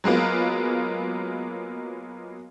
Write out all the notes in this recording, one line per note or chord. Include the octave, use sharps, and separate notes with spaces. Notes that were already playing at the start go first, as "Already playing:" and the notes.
F#3 G#3 A#3 B3 F4